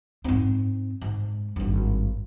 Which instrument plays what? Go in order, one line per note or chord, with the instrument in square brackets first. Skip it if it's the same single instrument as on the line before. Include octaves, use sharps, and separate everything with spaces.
[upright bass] G#2 C4
G#2
G#1 G2